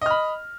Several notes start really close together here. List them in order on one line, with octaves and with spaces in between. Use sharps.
D#5 F6 B5